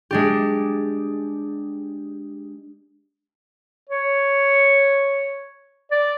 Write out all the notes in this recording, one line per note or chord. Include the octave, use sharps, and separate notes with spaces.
G#3 D4 G4
C#5
D5